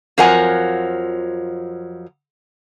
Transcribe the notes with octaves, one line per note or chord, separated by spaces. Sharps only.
F2 F3 F#3 A#4 F#5 G#5